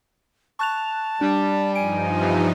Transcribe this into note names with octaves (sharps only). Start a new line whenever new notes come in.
A5 C#6 F#6 F7
G3 D4
G2 F3 D#4 G#5 D7
C3 E3